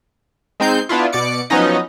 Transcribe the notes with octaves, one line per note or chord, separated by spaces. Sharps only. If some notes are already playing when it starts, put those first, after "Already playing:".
G#3 C4 D#4 G6 C7
B3 D4 E4 F4
B2 D5 D6 C#7
F3 F#3 B3 C#4 D#4 D#5